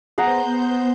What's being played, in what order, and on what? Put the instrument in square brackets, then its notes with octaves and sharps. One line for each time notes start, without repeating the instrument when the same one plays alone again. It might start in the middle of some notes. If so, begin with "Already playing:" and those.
[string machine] B3 C5 G6 [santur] G#4 F#5 A#5